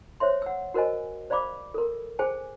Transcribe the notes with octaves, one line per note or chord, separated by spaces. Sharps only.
C5 C#5 E5 C6
F#5 E6
F#4 A#4 C5 D#5 G#5
C5 D5 F5 B5 D6
A4 A#4
G#4 C5 G5 G#5